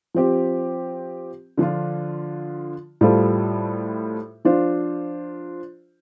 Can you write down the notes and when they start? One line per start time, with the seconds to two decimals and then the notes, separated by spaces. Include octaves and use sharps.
0.15 F3 C4 G4
1.58 D3 F3 D4 F4
3.01 A2 G3 F4 A4 C5
4.45 F3 D4 F4 C5